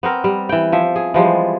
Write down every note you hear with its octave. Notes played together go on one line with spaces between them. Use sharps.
B3 C4 A#4
G3
E3 G5
F3 E5
G#4
E3 F3 G3 G#3